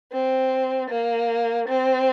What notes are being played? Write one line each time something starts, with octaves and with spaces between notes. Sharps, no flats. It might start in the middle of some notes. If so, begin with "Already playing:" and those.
C4
A#3
C4